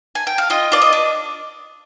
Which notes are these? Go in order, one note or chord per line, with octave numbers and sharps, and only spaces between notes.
G#5
G5
F5
F4 D#5
F4 D5
D#5
D4